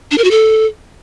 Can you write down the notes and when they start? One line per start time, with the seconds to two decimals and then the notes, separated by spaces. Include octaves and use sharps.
0.11 D4
0.18 A#4
0.24 F#4
0.31 A4